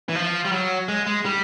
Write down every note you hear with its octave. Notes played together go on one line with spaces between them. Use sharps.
E3
F3
G3
F#3
G#3
G#3
G3